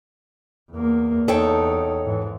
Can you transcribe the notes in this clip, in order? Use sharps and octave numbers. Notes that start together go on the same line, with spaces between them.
E2 A#3
E2 D#4 A4 C#5 G5
G#2 E3